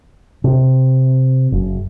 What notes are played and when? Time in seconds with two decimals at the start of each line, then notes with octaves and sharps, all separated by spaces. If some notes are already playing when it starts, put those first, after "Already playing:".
0.44 C3
1.52 F#1